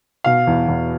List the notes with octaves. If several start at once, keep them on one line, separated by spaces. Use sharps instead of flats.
B2 F5
E2
E2